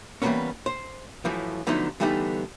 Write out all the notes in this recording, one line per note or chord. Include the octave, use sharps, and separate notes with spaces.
E3 G3 G#3 A#3 B3 C#4
C5
F#2 A2 E3 F3
D3 F3 F#3 A3 B3 D#4
D3 E3 G3 A3 B3 D#4